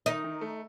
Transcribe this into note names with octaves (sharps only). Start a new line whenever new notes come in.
D#3 D#4
D#3
A3